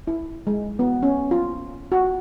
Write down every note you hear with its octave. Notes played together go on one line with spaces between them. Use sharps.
E4
G#3
B3
C#4
F4
F#4